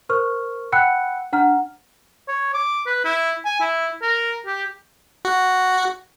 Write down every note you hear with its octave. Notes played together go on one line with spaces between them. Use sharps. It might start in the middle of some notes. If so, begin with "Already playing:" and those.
A#4 C5 C#6 F6
F#5 G5 B5 E6 F#6 C#7
D4 F#5 A#5 F6
C#5
D6
B4
E4
G#5
E4
A#4
G4
F#4